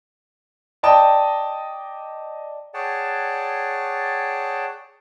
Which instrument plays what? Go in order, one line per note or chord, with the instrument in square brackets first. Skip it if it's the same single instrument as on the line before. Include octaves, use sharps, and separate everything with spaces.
[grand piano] D5 D#5 G5 A5 A#5 D#6
[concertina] G#4 C#5 D5 F#5 G5 A5